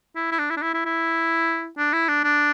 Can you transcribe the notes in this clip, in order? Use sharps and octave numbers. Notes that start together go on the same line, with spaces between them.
E4
E4
D4
E4
D4
E4
E4
E4
D4
E4
D4
D4